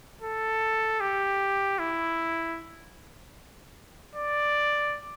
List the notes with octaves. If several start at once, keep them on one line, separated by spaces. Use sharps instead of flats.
A4
G4
E4
D5